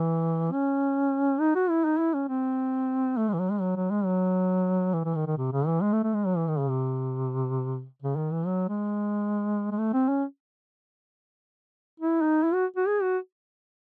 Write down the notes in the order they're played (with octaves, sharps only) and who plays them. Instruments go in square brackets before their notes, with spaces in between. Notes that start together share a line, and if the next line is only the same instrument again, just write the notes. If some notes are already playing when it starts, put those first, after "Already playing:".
Already playing: [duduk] E3
C#4
D#4
F#4
E4
D#4
E4
C#4
C4
A3
G#3
E3
F#3
G#3
F#3
F#3
G#3
F#3
E3
E3
D#3
D#3
C3
C#3
E3
G#3
A3
A3
G#3
F#3
E3
D#3
C#3
C3
C#3
D#3
E3
F#3
G#3
G#3
A3
C4
C#4
E4
D#4
E4
F#4
F#4
G#4
F#4